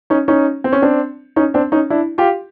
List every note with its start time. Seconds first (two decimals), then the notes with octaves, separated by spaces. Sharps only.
0.10 C#4 D#4
0.28 C#4 D#4
0.64 C4
0.73 C#4
0.82 C4 D4
1.36 C#4 D#4
1.54 C4 D4
1.72 C#4 D#4
1.90 D4 E4
2.18 F4 G4